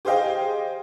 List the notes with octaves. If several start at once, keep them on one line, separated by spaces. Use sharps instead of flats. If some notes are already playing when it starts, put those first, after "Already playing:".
G4 G#4 C5 D#5 F5 G5